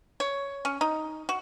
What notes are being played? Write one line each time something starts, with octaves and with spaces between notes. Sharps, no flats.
C#5
C#4
D#4
F#4